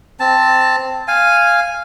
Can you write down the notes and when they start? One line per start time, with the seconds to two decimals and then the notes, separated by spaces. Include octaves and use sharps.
0.20 C4 A5
1.08 F5 G#5